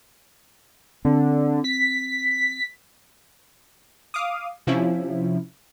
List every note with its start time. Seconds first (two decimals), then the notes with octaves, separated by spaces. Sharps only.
1.05 D3 C4
1.64 B6
4.14 F5 D6 D#6
4.67 C3 F3 C#4 E4